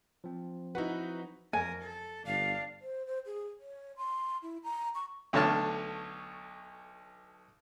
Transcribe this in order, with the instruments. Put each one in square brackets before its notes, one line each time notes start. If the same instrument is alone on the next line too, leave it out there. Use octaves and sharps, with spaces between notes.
[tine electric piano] F3 C4
[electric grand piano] D#4 F#4 B4 [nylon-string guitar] E4 F#5
[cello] F2 A#4 [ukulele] G#5
[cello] A4
[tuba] G1 [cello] D4 [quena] F5
[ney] C5
C5
G#4
C#5
C6
E4
A#5
C#6
[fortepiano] B1 D3 A3 C#5 A5 F6